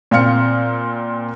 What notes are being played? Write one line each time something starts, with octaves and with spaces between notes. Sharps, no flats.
A#2 C4 F5 F6 C#7